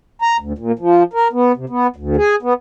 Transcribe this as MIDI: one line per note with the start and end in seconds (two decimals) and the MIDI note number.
0.22 0.37 82
0.40 0.53 38
0.58 0.72 46
0.79 1.03 53
1.13 1.28 70
1.33 1.52 59
1.56 1.65 48
1.69 1.87 59
1.96 2.16 38
2.17 2.35 68
2.42 2.53 59